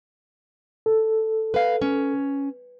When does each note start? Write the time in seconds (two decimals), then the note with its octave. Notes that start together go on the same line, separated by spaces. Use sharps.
0.86 A4
1.54 B4 F5
1.81 C#4